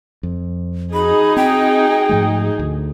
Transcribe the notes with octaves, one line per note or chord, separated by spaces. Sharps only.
F2
D#4 F#4 G#4 B5
C4 G5
G#2 F3 A3
D2